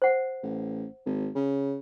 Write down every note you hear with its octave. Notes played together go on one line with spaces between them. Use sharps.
C5 F#5
A1
G#1
C#3